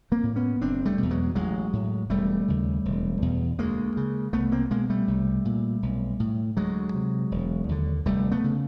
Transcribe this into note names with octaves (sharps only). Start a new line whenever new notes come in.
A#3 C4
A2
B3 C#4
F#1 C4 D4
G3 A3
E2 B2
F#3 G#3
A1 F#3 G#3
A2
E1 G3 A3
D#2 C#3
E1
E2 B2
D2 G#3 A#3
C#3
C2 A3 B3
A#3 C4
B2 G#3 A#3
G3 A3
C2
A#2
B1
A2
D2 F#3 G#3
C3
E1
D#2 D3
F1 G3 A3
A3 B3
C#3